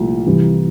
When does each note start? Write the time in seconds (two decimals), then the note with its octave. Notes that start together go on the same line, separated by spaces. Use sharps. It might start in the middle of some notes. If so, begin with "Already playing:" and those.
Already playing: C2 A#2 F3 A3
0.26 C2 C3 E3